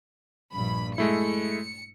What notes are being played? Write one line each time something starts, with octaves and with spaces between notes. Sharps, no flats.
A#1 G2 B5
G#3 A3 E4 C#7